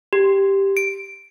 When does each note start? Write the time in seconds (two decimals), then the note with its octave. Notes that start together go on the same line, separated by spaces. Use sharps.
0.13 G4
0.77 D7